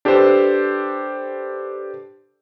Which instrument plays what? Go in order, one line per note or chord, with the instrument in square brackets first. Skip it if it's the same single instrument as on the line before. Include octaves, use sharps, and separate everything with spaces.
[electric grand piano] D4 G4 A4 B4 C5